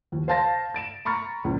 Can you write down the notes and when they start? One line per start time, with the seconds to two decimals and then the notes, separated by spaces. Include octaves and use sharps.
0.12 D#2 F3
0.28 C5 F5 A5 C6 A6 A#6
0.74 A6 D7 E7
1.05 A#5 B5 C#6 F6 A6
1.44 C#2 A#2 C#3 F3